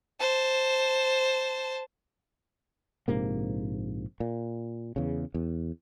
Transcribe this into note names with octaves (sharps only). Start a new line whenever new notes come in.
C5 A5
A#1 G#2 C3 A#3
A#2
E2 C#3
E2